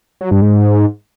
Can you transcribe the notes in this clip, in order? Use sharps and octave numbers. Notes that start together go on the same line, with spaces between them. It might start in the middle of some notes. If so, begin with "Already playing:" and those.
F#3
G2
G#2